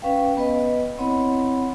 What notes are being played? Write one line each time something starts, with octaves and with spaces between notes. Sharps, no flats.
C#4 B4 F5 G5
B3 B4 D#5
C4 E4 C#5 F#5 B5